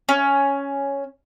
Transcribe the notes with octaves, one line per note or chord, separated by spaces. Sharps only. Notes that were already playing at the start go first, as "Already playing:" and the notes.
C#4